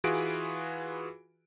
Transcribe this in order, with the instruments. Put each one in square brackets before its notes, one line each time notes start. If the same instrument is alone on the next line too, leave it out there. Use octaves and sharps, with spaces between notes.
[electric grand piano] E3 F4 F#4 G#4 B4 D7